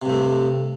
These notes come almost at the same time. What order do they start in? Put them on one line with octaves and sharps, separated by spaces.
C3 G2 A3